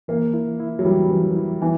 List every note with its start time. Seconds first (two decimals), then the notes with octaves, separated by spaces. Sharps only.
0.08 E3 A#3
0.34 E4
0.60 E4
0.79 F#3
0.85 E3 G3
1.10 E3
1.36 E4
1.62 E3 B3